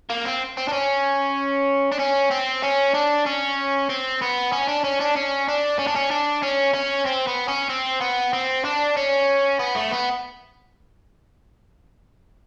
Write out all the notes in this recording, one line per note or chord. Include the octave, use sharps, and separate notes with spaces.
A#3
C4
C4
D4
C#4
D4
C#4
C4
C#4
D4
C#4
C4
B3
C#4
D4
C#4
D4
C#4
D4
C#4
D4
C#4
D4
C#4
C#4
C4
B3
C#4
C4
B3
C4
D4
C#4
B3
A3
B3